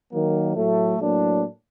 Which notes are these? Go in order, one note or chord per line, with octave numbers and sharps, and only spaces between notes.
D#3 F#3 A#3
A2 F#3 A3
A2 F#3 A#3 D4